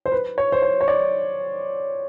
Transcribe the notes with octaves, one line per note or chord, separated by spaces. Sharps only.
C5
B4
C#5
C5
C#5
C#5
D5